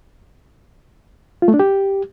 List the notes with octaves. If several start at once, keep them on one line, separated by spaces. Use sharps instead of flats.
F4
A3
D4
G4